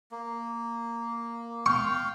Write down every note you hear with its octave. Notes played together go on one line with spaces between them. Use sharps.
A#3
F5 G5 C#6